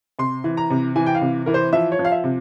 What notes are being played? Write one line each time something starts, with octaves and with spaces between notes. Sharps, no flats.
C3 C6
E3
A#5
C3
E3 G#5
G5
F5
C3
E3 A#4
C5
F3 E5
C#5
F3
F5
E5
C3